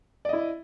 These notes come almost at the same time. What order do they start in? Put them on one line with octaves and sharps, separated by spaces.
D5 D#5 E4